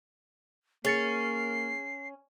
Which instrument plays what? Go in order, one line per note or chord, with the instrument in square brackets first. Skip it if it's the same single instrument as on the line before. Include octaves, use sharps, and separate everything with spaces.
[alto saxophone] A#3 [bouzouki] C#4 [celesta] G#4 A6 C#7 [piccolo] C7